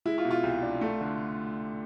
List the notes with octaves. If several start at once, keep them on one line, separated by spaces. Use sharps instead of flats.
G#3 E4
F4
B2
F4
C2
D4
A3
D3